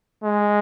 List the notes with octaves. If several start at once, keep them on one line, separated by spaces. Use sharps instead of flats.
G#3